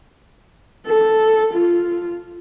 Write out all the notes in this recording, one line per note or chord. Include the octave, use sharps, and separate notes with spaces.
A4
F4